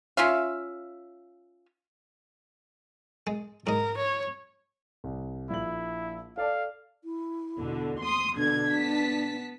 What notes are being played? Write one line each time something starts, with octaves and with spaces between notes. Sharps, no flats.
C#4 F4 E5 F5
G#3
G#2 A#4 D#5
C#5
C2
A#1 E4 F#7
A4 D5 F5 A5
E4
E2 B2 D3
C6 D#6
B2 D3 D4 G#6
B3 A5 B6